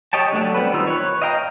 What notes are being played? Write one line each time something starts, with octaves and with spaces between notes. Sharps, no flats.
G4 C#5 D#5 G5 A5
F#3 A3 D4
G3 B3 C4 B4
D#3 D#4 F4 E6
B4 C#5
D#5 F5 G5 A#5